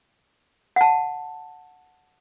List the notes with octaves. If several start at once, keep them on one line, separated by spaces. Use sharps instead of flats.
F#5 A5